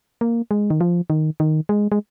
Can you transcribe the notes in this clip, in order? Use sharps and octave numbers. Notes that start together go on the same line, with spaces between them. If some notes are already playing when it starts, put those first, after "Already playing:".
A#3
G#3
D#3
F3
D#3
D#3
G#3
G#3